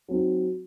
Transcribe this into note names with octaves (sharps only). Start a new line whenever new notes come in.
F#3 C4 D#4